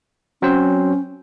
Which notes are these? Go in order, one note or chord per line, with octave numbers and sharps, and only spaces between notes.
F#3 C4 C#4 C5